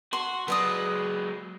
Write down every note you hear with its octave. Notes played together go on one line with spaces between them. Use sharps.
F#4 C6
F#3 G#3 B4 D5 D#6